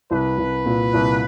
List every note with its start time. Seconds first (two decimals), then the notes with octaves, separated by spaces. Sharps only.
0.10 C2 B4
0.38 C2
0.66 A#2
0.94 C2